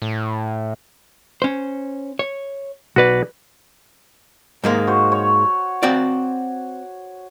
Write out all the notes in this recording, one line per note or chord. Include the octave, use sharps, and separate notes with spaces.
A2
C#4 C5
C#5
B1 F#4 B4 D5
G#2 G#3 A#3
F#4 C5
C#5
C4 F#4 D5